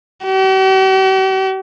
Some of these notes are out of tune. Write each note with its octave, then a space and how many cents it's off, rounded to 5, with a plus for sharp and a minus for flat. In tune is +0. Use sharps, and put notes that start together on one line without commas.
G4 -45